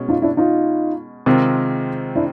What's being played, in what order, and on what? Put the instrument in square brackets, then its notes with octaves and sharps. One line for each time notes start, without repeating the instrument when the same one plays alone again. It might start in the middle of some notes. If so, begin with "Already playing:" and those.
Already playing: [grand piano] B2 G#3 C#4
[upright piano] D#4 F4
D4 E4
D#4 F4
[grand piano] C3 D#3 G#3 C4 F4
[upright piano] D4 E4